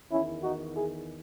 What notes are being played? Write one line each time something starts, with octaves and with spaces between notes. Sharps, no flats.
E2 D#3 C#4 E4
D#4 F#4
E4 G#4